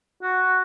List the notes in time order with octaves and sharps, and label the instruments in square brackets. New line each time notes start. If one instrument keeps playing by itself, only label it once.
[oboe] F#4